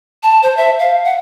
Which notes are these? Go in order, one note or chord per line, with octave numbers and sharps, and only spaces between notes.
A5
C5
E5
F5
F#5